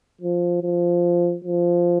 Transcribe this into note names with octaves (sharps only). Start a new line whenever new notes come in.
F3
F3
F3